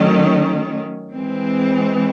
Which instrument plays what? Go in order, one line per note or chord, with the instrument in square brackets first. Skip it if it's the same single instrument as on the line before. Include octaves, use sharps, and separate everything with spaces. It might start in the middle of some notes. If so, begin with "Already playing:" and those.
Already playing: [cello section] D#3 F#3 A3 C#4
E3 G#3 C4